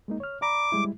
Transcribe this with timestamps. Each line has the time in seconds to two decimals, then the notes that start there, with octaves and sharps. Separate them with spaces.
0.08 G#3 A#3 D#4
0.20 C#5 F6
0.42 D5 A#5 B5 D6
0.72 G3 G#3 E4